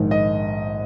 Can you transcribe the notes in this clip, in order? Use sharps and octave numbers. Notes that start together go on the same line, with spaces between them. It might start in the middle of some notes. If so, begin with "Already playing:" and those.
Already playing: A#1 G#2 D#3
D#5